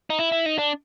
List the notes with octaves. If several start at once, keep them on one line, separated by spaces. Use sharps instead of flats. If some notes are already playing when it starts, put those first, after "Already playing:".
D#4
E4
E4
D#4
D4